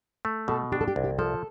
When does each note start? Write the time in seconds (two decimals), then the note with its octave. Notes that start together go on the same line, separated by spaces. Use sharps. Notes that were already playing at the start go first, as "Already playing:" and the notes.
0.25 A3
0.48 B2 A4
0.72 D4 G4
0.81 A4
0.88 G4
0.96 C2
1.04 G4
1.19 F3 A4